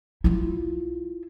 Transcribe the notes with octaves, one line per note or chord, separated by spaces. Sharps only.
E4 F4